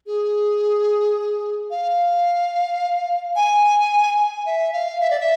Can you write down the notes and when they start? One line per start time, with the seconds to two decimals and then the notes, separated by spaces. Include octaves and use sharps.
0.07 G#4
1.71 F5
3.36 G#5
4.18 G#5
4.46 E5
4.73 F5
5.01 E5
5.10 D5
5.20 E5